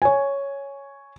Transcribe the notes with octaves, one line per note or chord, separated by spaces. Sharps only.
C#5 G#5